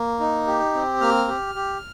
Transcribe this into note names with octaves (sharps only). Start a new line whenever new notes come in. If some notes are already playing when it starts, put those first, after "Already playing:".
Already playing: A#3
D#4
G4
C4
A#3 F6
G4
G4